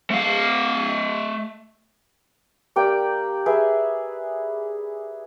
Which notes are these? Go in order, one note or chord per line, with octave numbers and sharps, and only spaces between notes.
A3 F5
A#3 G4 D5 G5
G#4 B4 E5